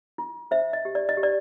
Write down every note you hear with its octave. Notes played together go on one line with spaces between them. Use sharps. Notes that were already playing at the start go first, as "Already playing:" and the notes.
E4
C5 E5
D#5
G4
D5
D#5
G4
D5